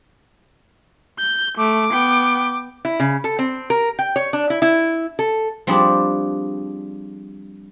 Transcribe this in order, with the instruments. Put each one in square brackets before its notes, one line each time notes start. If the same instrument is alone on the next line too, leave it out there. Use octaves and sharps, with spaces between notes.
[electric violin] G6
[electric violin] A3 [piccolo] D6
[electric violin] B3 G5
[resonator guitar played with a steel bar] E4
C#3
A4
C4
A#4
G5
C#5
D4
E4
E4
A4
[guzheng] F3 G3 C4 D4 G#4